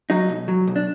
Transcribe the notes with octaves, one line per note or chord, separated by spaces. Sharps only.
F#3 D#4
B1
F#3
B1
D4